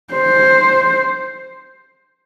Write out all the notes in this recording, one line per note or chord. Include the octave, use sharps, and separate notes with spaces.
C5